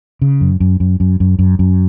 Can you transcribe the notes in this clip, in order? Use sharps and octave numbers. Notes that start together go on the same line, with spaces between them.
C#3
F#2
F#2
F#2
F#2
F#2
F#2
F#2